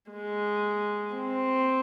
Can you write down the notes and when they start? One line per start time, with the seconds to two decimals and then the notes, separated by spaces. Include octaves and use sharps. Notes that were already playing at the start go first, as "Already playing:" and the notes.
0.11 G#3
1.14 C4